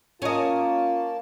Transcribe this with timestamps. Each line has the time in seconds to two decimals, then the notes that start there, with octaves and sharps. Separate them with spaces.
0.22 A#3 C#4 F4 D#5 A5